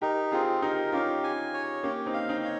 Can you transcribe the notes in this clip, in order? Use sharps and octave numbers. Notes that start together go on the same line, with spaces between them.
D#4 G4 A#4
C4 F4 G#4
D#4 G4 A#4
C#4 F4 G4
G#5
C#5
A#3 C#4 G4
C4 D#4
F5
C4 D#4
C#5